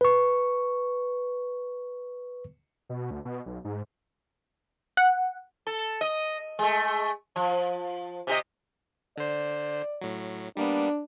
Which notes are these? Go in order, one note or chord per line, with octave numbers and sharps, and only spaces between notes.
B4 C#6
B2
D2
B2
B1
G#2
F#5
A4
D#5
G#3 A3
F3
C3 G4 D#5
D3 C5 D5
A2 F#3
G3 A#3 B3 D4